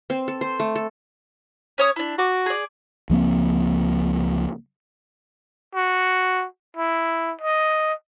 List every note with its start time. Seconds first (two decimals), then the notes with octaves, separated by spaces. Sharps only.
0.10 C4
0.28 A4
0.41 C5
0.60 A3
0.76 A4
1.78 C#4 C#5 D#6
1.96 D4 E4
2.19 F#4 D6
2.46 G#4 D5
3.10 C#2 F3 A#3 C4
5.75 F#4
6.77 E4
7.41 D#5